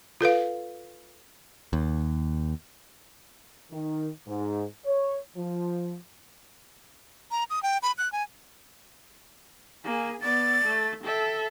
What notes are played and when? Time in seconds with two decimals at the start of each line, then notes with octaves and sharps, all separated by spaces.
0.21 F4 A4 B4 F5
1.73 D#2
3.71 D#3
4.28 G#2
4.85 C#5
5.37 F3
7.31 A#5
7.50 D#6
7.63 G5
7.83 B5
7.98 F#6
8.12 G#5
9.84 A#3 G#4 G#5
10.21 B3 D5 A6
10.64 A3
11.04 A4 E5 G5